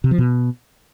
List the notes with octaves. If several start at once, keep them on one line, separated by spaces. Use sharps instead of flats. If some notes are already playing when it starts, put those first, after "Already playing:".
C3
F3
B2